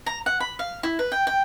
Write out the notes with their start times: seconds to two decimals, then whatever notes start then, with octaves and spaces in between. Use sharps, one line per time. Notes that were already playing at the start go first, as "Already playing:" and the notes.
0.06 A#5
0.26 F#5
0.40 B5
0.59 F5
0.83 E4
0.99 B4
1.12 G5
1.27 G5